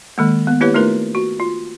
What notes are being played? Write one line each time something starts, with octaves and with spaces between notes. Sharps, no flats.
D#3 G#3 A#3
B3
A#3 E4 G4 B4 C#5
A3 D#4 F4 A#4 B4
F#4
F4